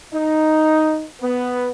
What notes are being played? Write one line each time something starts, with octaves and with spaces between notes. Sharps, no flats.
D#4
B3